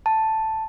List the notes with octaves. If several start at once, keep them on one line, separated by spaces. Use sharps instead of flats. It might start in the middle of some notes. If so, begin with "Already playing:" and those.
A5